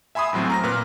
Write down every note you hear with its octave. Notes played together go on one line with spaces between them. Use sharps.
E5 G#5 B5 C6 D#6
E2 A2 F#3 C4
A#5 F6 A#6
A#2 B4 F6